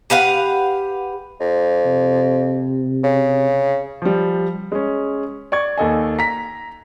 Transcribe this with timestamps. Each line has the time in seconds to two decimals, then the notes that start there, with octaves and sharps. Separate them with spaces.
0.10 G4 B4 F5 F#5
1.40 F2
1.85 C3
3.04 C#3
4.02 F3 G3
4.72 G#3 C#4
5.52 D5 C#6 G#6
5.78 D#2 A4 D#5 G#5
6.19 A#5 B6